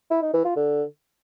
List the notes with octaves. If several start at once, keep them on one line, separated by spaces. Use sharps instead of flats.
E4
D#4
E3
F4
D3